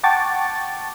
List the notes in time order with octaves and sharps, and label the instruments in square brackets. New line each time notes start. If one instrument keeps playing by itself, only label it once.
[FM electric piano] F#5 G5 A5 C#6 D6 A6